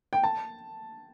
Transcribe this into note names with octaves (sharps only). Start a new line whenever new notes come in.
G5
A5